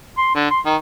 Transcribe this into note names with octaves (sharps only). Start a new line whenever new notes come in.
C6
D3
C6
D#3